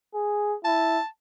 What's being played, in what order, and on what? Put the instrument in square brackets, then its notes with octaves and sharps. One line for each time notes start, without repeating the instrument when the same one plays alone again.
[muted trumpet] G#4
[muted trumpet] E4 [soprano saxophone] A5